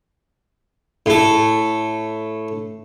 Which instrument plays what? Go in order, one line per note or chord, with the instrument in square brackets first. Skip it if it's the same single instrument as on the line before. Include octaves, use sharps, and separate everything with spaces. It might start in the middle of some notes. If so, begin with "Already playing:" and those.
[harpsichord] A2 A4